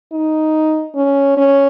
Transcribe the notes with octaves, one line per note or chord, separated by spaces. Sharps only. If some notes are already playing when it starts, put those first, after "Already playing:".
D#4
C#4
C#4